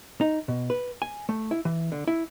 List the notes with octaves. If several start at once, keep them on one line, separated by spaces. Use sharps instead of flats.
D#4
B2
B4
G#5
A3
E4
E3
D3
E4